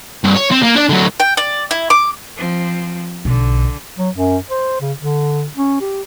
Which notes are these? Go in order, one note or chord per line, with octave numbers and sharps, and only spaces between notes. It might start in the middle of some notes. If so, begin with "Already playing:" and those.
C2 G2
C#5
C4
A#3
D4 D5
D3 F#3
G5
D5
E4
D6
F3 C4
B1 D3
F#3
F#2
C5
C#3
D3
C#4
G4